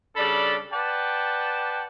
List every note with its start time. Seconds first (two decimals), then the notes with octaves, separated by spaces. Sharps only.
0.17 C#3 G3 D4 A4 D5 B5
0.72 B4 D5 F#5 G5 A5